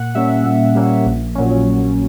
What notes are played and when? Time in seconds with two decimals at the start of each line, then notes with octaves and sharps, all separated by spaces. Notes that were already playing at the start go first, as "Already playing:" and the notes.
Already playing: A#2 F#5
0.15 G3 A#3 C#4 E5
0.45 A#2
0.75 G3 A#3 C#4
1.06 A#1
1.35 A#2 F#3 C#4
1.66 A#1